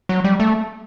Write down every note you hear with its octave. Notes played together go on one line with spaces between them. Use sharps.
F#3
G3
A3